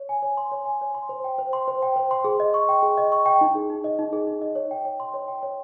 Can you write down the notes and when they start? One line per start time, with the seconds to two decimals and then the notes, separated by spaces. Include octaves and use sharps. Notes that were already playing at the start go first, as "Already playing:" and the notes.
Already playing: C#5
0.09 G#5
0.23 C#5
0.37 C6
0.52 C#5
0.66 G#5
0.81 C#5
0.95 C6
1.09 C5
1.24 G5
1.39 C5
1.53 C6
1.68 C5
1.82 G5
1.96 C5
2.11 C6
2.24 G#4
2.40 D#5
2.54 C#6
2.69 G5
2.83 G#4
2.98 D#5
3.12 C#6
3.26 G5
3.41 D#4
3.55 G#4
3.70 D#4
3.84 D#5
3.99 D#4
4.13 G#4
4.27 D#4
4.41 D#5
4.55 C#5
4.71 G5
4.85 C#5
5.00 C6
5.14 C#5
5.28 G5
5.43 C#5